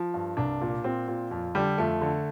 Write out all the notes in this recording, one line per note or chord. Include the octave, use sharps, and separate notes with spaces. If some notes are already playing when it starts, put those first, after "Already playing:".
Already playing: F3
G2
C2 D4
A#2
A#2 C4
A#2
F2
D3 G3
F2 A3
D3